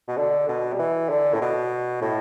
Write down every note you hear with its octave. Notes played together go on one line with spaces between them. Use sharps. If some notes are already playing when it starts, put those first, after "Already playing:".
B2
D3
B2
G3
E3
D3
A2
B2
A2